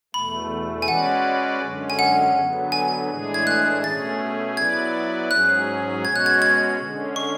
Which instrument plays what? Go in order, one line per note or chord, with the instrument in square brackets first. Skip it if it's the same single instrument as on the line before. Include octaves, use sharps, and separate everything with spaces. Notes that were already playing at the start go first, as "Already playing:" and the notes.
[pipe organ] E2 B2 A3 [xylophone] B5
[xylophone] G#5
[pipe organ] G#3 C#4 F#4 B4 D5 [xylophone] F#5
[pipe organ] F#2 D3 G#3 C#4
[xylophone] G#5
F#5
[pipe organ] D3 F#3 B3
[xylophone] G#5
[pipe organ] A2 E3 G#3 D4 G#4
[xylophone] G#6
F#6
[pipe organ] B2 A3 C#4 G#4 [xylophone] A6
[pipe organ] F#3 B3 E4 B4 D5 [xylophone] G#6
[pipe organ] G#2 F#3 C#4 G#4 [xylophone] F#6
[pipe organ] B2 G#3 C#4 F#4 [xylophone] G#6
[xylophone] F#6
G#6
G#6
[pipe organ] D3 G#3 C#4
[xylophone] C#6